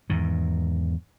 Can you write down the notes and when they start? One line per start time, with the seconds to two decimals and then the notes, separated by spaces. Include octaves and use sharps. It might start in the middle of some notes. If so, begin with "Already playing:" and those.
0.10 E2 G#2 D#3